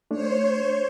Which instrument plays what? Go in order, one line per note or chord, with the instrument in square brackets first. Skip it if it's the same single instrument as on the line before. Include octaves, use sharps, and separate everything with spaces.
[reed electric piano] A3 D4 [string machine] C5 C#5